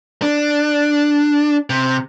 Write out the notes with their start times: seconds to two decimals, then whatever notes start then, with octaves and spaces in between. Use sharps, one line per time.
0.22 D4
1.70 C3